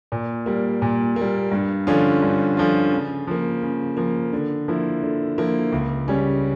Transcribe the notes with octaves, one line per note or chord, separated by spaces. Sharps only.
A#2
G3 A#3
A#2
G3 A#3
G2
D3 F3 C#4 F4
G2
D3 F3 C#4 F4
C#3
F3 A#3
C#3
F3 A#3
D3
F3 A#3 E4
D3
F3 A#3 E4
C#2
C#3 G3 C#4